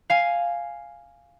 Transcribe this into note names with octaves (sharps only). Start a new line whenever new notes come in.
F5 G#5